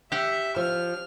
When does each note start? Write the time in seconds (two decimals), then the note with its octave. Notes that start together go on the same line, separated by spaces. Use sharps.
0.12 G4 E5 F#5 G5
0.56 F3 F6